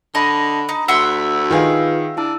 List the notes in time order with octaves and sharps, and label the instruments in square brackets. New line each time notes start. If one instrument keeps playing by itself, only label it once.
[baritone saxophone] D3 [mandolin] D#5 [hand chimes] A5 B5 A#6
[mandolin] D#4
[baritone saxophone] D2 [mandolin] E5 F#5 C6
[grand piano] D#3 G#4 [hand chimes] F4 B4 F5
[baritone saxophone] D4 [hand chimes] E4 A5 E6